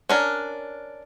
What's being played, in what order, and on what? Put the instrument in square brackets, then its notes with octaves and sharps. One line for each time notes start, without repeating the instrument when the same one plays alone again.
[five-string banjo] C#4 D4 A#4